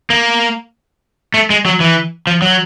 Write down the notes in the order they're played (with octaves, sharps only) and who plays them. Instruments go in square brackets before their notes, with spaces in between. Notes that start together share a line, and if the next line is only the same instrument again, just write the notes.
[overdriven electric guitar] A#3
A3
G#3
F#3
E3
F3
F#3